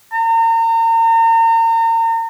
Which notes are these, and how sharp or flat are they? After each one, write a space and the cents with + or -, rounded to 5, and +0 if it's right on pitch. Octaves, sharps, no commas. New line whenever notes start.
A#5 -35